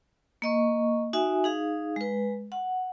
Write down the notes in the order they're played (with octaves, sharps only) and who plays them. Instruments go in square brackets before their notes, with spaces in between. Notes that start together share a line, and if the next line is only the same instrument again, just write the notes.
[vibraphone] A#3 D#5 C#6
D#4 F#4 E5 G#5
D#4 G#4 F5
G#3 B4
F#5